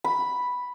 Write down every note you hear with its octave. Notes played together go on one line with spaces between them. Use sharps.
B5